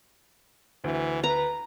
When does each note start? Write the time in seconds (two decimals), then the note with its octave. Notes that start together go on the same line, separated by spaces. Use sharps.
0.84 D2 E3
1.24 B4 A#5